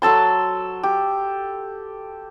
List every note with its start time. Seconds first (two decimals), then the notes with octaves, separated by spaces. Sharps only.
0.02 F#3 A4 A5 C6
0.83 G4